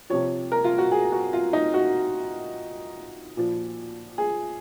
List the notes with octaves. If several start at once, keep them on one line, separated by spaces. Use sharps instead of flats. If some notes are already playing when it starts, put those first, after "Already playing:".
C3 F3 C#5
A#4
F4
F#4
G#4
F#4
F4
D#4
F#4
A#2 F3
G#4